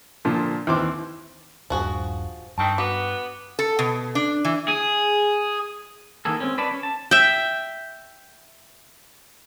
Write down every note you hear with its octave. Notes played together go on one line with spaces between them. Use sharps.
A#2 D3 F3
D#2 E3 C4 C6 D6
D#1 G2 F3 F#4 G#4
G2 D#3 C4 A5 C#6
B3 F#4 D6
A4
B2
D4
E3
G#4
D#3 E3 A#3 G#4 A4
G#3 C4 C#4
B4 C#5 D5 A5
C#4
A5
E5 G5